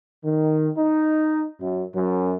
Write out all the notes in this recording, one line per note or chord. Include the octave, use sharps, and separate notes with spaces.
D#3
D#4
F#2
F#2